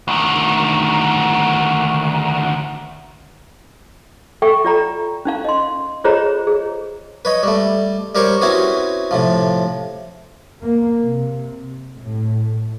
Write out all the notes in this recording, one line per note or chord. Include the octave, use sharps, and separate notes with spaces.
D2 D#3
A4 E5 G5 C#6
F4 D5 A#5
C#4 D#4 F5
D#5 C6
F4 G#4 C5 C#5 D#5 A#5
G#4
B4 C#5 D#5
G3 A3
G3 G4 A#4 C5 C#5 C#6
C4 C#4 E4 F#4 G#4 B4
A2 C3 F3
A#3
C3
A2